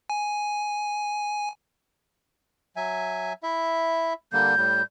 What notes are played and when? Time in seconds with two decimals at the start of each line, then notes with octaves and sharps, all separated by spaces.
0.10 G#5
2.76 F#3 E5 G#5
3.43 E4 E5
4.33 D3 G3 A#3 G6
4.57 A2 G3